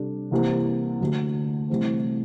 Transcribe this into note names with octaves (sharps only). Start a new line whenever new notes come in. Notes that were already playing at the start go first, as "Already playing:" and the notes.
Already playing: C3 G3 D4 A4
C2 C3 E3 A#3
D2 D3 A3
C2 C3 E3 A3 C4